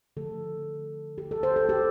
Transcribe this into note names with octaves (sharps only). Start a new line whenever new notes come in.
D3 F3 A3 A4
G4
A4
C5
A4
G4